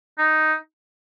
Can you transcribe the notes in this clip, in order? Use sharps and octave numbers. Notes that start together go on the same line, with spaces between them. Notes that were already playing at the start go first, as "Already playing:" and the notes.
D#4